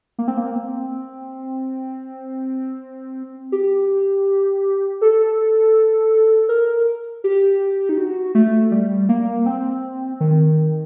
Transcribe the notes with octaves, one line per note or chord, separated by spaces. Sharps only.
A#3
C4
A#3
C4
G4
A4
A#4
G4
D#4
F#4
A3
G3
A#3
C4
D#3